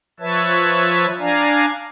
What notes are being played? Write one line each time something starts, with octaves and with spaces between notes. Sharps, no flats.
F3 B4 C#5 E5 A5
D4 D5 F5 G#5 A#5